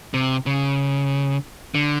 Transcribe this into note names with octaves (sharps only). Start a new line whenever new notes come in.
C3
C#3
D3